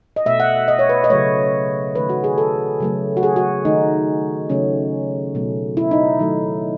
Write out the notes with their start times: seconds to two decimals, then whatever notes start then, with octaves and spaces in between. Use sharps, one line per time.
0.16 D#5
0.26 B2 A3 E5
0.40 F#5
0.68 D#5
0.79 C#5
0.89 B4
1.04 D#5
1.10 C#3 F#3 A3 C#5
1.95 D#3 A3 B4
2.09 F#4
2.24 G#4
2.38 A4
2.80 C#3 F#3 A3
3.17 F#4
3.23 G#4
3.36 F#4
3.65 D#3 A3 D#4
4.50 C#3 F#3 A3 C#4
5.35 B2 F#3 A3
5.77 E4
5.91 D#4
6.19 D#3 F#3 A3